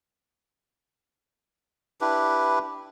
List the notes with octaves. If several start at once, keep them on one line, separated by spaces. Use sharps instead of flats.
D4 E4 G4 B4